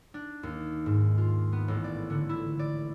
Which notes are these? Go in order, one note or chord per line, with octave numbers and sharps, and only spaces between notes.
D4
D#2
G#2
F4
B3
A1
D5
D3
E4
D5